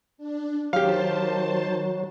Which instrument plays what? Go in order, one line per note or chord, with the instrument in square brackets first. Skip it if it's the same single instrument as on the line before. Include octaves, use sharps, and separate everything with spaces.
[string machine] D4
[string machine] D#3 C5 A5 [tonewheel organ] F#3 [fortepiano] G4 F5